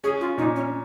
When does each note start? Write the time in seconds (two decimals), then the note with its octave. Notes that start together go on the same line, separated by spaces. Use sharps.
0.04 C#4 G#4
0.21 F4
0.38 A#2 D#4
0.56 C#4